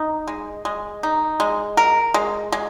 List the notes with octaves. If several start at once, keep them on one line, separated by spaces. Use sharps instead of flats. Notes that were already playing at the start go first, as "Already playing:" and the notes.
Already playing: D#4
G#3
G#3
D#4
G#3
A#4
G#3
G#3